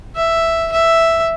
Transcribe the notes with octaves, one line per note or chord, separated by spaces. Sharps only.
E5
E5